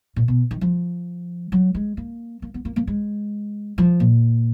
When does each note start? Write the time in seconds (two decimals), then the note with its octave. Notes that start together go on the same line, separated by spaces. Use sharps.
0.16 A#2
0.28 B2
0.51 D#3
0.61 F3
1.52 F#3
1.75 G#3
1.97 A#3
2.42 A#3
2.54 B3
2.65 A#3
2.76 A#3
2.87 G#3
3.78 F3
4.00 A#2